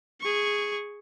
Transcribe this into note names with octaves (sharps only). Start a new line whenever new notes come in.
G#4 C#6